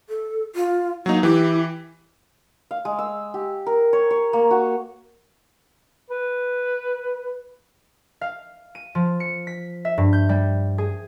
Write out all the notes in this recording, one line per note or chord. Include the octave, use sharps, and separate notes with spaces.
A4
F4
F#3 A#3 D#4
E3 E4 G4
F5
G#3
E6
G4
A#4
C#5
C#5
A#3
F#4
B4
F5
D#7
F3
C#7
B6
E5
G2
G6
G3
G#4